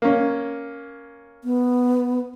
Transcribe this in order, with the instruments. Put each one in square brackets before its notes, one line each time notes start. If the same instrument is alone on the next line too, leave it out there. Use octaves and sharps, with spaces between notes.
[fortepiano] A#3 C#4
[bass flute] B3